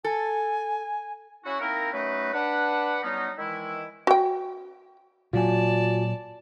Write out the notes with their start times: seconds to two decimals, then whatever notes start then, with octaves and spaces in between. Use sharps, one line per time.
0.04 A4 G#5
1.44 C#4 E4 F#4
1.59 A#3 C4 D#4 E4 A#4
1.92 F#3 A3 C#4 D#4 B4
2.32 D4 B4 F#5
3.02 F#3 G3 B3 C#4 D#4
3.38 D#3 E3 G#3 E4
4.07 F#4 G5
5.33 A#2 F#3 F4 F#4 D5 G#5 A5